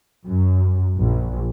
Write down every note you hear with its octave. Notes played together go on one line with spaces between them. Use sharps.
F#2
A#1